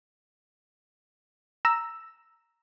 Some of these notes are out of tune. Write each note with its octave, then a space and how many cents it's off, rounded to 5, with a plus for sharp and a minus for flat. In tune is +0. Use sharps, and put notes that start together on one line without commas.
A#5 +0 E6 +0